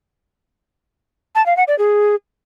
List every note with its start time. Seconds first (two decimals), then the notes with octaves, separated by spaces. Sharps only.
1.35 A5
1.46 F5
1.57 F#5
1.68 D5
1.78 G#4